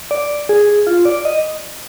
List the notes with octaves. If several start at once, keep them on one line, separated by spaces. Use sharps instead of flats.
D5
G#4
F4
D5
D#5